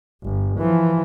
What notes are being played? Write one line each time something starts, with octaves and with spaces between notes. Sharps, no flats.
G1
E3 F3